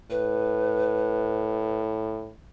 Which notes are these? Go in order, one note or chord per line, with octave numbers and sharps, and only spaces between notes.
A2 B4